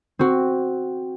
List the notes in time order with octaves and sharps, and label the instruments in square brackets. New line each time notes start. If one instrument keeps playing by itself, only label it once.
[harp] C4 F#4